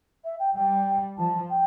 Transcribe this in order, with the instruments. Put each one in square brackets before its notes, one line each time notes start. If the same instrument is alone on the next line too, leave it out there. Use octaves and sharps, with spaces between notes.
[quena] E5
G5
[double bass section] G3 [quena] G5
[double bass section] F3 [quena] A5
[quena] G5